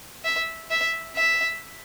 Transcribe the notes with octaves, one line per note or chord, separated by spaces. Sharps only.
E5
E5
E5